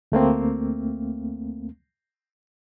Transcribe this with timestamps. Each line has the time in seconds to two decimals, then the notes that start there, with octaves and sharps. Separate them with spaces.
0.12 D2 A3 A#3 C4